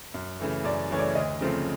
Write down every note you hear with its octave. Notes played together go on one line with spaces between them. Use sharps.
F#2
C#3 E3 A3
F#2 D5
C#3 E3 A3 C#5
D5
D2 D#5
C#3 F3 A3 C4